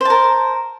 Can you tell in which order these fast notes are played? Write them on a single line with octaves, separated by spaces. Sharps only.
C5 A5 A#4